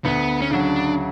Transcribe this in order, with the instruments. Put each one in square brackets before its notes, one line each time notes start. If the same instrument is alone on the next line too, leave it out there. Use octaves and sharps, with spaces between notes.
[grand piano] D2 [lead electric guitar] B3
[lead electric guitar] C#4
[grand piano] C#3 F#3 [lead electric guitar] D4